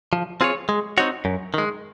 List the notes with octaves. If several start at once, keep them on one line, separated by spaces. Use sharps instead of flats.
F3
C4 F4 G#4 C#5
G#3
C4 D#4 F#4 C#5
F#2
D#3 G#3